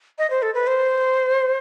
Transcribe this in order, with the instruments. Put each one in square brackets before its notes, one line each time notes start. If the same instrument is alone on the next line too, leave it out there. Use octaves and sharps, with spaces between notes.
[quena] D#5
C5
A4
B4
C5